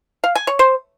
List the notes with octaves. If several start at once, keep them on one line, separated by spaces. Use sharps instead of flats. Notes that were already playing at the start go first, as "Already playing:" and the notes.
F5
G#5
C#5
C5